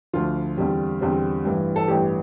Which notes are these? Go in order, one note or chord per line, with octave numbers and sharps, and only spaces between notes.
D2 D3 F3 F4
E2 D3 G3 C4
E2 D3 G3 C4
A1 G2 E3
A4
A1 G2 E3 G4